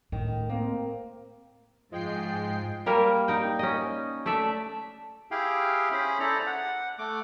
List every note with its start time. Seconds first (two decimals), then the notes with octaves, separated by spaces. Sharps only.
0.12 A2 D#3
0.50 A#3 C4
1.92 G#2 F3 G#3 G5 C7
2.86 G3 A#3 A#4
3.28 D#4 G5
3.59 C#4 D#5
4.26 A3 D5 E5
5.31 E4 G4 G#4 F5 G5
5.92 C#4 G#4 C5 B5
6.20 E4 A4 C5 D5 A#5
6.46 F#5
6.99 A3 D6